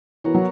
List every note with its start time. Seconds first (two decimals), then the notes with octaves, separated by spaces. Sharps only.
0.24 E3 B3 F#4 A#4 C#5
0.35 F#3